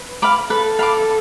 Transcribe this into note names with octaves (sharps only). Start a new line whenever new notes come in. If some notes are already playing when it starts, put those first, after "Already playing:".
Already playing: B4
F5 B5 D6
A4 B4
F5 B5 D6